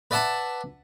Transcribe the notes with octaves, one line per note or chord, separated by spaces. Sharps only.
B4 D5 E5 F#5 A5 B5